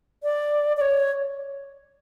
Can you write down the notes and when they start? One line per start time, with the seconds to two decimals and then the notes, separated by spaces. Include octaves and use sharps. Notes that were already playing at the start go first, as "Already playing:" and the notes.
0.23 D5
0.77 D5
0.81 C#5